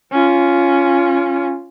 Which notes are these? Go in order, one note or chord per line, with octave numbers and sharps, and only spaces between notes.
C#4 F4